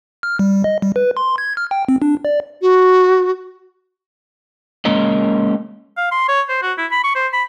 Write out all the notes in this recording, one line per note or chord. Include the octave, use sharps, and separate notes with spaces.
F6
G3
D#5
G3
B4
C6
G#6
F6
G5
C4
D4
D5
F#4
G#3 A#3 C#4 A#4 D#5
F5
C6
C#5
C5
F#4
E4
B5
C#6
C5
B5